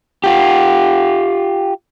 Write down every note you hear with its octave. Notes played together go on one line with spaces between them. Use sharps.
F4 G4